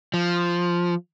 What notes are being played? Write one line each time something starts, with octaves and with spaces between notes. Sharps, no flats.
F3